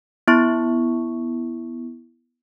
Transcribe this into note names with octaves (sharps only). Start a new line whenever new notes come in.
B3 E4 C#6